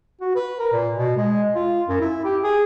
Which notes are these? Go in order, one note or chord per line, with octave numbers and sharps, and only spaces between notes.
F#4
B4
A#4
A#2
B2
G#3
F4
F#2
E4
G4
G#4